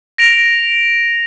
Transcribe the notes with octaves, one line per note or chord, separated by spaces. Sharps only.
A#6 D7 F7